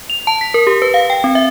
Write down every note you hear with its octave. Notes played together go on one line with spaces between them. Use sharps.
F7
A5
B6
A#4
G4
B4
F5
G5
C4
E5